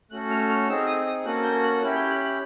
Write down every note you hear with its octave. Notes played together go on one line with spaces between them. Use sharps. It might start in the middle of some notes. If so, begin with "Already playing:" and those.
A3 C#4 F#4 A4 F#6
F6
F6
C4 D#4 G#4 E6
D#6
D#6
A#3 C#4 F#4 A4 F#6
G6
F#6
C#4 E4 G4 F#6
G6
F#6
F#6